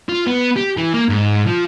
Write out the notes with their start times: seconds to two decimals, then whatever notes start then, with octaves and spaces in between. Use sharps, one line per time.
0.09 F4
0.27 B3
0.56 G4
0.77 E3
0.94 A#3
1.09 G#2
1.46 F3